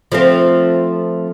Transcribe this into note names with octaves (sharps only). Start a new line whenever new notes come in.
F3 A3 C4